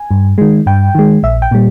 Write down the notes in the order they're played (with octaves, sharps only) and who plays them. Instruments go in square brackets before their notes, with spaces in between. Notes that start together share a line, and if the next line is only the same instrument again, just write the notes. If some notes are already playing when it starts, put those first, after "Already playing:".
Already playing: [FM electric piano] G#5
G2
D#3 G#3
G2 G5
D#3 G#3
A#1 E5
G5
A#2 G3